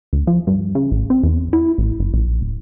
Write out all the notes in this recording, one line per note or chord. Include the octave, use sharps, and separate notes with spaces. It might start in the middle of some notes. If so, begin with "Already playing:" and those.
D2
F3
G2
C#3
A1
C4
E2
E4
A1
G1
A#1
D1